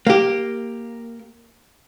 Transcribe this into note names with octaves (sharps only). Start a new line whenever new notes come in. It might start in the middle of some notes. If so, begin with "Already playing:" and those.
A#3 G4